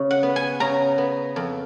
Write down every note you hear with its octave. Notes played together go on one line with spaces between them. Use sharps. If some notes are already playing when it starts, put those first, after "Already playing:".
Already playing: C#3
F#5
B3
G#5
C#3 A#5
B3
F2